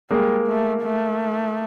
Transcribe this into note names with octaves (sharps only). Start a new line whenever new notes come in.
G3 G#3 A#3
A3
A3